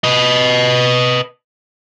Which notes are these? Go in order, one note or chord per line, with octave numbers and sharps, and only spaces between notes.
B4 D#5